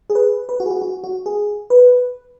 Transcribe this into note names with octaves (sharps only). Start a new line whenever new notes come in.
G#4
B4
B4
F#4
G#4
F#4
F#4
F#4
G#4
B4